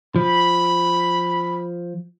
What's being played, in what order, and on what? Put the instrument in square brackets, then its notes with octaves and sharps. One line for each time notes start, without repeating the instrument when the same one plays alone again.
[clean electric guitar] F3 [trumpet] B5